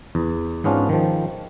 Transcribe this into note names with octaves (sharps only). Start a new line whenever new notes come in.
E2
G#2 B3 C#4 D4 F4
D#3 F3